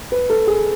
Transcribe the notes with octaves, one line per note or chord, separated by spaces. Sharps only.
B4
A4
G#4